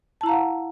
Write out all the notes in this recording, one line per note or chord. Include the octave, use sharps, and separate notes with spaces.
E4 F5 F#5 A5 A#5